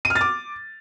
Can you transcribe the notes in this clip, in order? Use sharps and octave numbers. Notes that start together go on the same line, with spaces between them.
D#7
F6
A6
D6